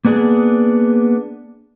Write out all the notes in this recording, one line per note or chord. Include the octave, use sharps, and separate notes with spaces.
A#3 B3 D4 G#4